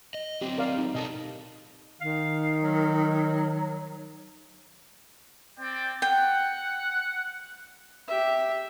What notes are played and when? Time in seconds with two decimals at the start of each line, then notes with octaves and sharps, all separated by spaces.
0.14 D#5
0.41 F#3 C4 G4
0.58 A#4 D5 F5
0.78 D#4
0.95 B2 G4 A4 D#5 A5
2.01 D#3 F5
2.62 F#3
5.59 C4 D5 G5
6.02 F#5 G5
8.08 G4 E5